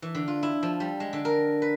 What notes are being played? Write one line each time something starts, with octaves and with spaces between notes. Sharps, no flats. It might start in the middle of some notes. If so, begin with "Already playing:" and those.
E3
D3
F4
E4
F3
G3
G#3
D3
A#4
B4